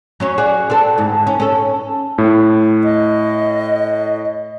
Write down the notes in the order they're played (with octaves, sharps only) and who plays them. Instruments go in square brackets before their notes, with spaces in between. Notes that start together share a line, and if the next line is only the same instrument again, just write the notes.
[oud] F#3 C#4 C#5
F#4 G#4 D5
C4 D4 A4
G#2 D3
C#4
C#4 A4
[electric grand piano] A2
[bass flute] D#5